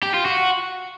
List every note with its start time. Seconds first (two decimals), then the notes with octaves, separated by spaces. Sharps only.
0.03 G4
0.14 F4
0.26 F#4